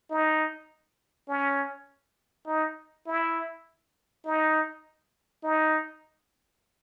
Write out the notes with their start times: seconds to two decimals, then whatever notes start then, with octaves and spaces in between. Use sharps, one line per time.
0.10 D#4
1.28 C#4
2.47 D#4
3.07 E4
4.25 D#4
5.44 D#4